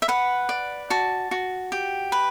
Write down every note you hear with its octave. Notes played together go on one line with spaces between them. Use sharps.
E5
B4 F#5
D5
F#4 A5
F#4
G4
B4